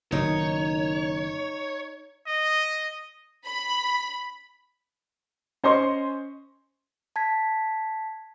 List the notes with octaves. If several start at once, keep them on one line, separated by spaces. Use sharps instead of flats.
F#1 B2 D#3 D#4 C#5
D#5
B5
C#4 C5 D#5 C6 C#6
A5 G#6 B6